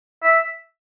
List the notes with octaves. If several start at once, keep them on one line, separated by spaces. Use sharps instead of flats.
E5